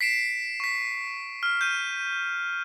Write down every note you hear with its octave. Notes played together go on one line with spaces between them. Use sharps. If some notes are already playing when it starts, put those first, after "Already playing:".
B6 C7 D7 E7
C#6 B6
F6
G6 D#7